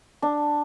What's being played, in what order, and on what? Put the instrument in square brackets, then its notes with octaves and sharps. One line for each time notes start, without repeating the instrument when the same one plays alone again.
[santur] D4